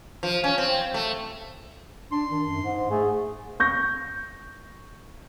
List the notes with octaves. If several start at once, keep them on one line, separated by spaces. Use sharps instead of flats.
F3
C#4
C4
A3
D4 C6
D#3
F#2
G#2
A3 G#4
C#6 G6 A#6